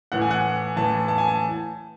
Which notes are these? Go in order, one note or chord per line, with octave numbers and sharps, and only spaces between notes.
A2 E3 F#5
G#5
F#5
A2 E3 A5
A5
G#5
A5